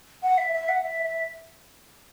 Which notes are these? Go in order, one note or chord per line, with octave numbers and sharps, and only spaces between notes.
F#5
E5
E5
F#5
E5
E5